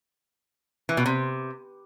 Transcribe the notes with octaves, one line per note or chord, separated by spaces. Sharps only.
E3
B2
C3